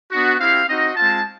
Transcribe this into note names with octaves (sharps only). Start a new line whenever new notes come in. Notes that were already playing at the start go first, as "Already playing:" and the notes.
B3 D4 F#4
C4 E4 G4 F5
C4 D#4 F#4 D#5
G#3 C4 F4 A5